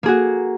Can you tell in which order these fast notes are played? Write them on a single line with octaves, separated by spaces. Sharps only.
A#3 G#4 F#4